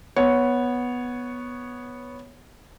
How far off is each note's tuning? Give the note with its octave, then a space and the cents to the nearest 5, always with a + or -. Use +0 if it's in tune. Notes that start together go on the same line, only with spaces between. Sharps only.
B3 -5 C#5 +0